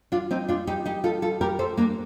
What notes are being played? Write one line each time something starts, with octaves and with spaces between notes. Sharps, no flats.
D4 F4
C4 D#4
D4 F4
D#4 G4
D#4 G4
F4 A4
F4 A4
G4 A#4
A4 C5
A#3 D4